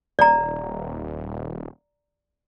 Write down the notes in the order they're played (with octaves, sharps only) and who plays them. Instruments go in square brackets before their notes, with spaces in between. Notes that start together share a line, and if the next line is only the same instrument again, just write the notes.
[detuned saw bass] D#1 [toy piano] D5 A#5